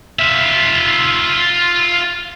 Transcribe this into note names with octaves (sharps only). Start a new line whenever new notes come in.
F4 E5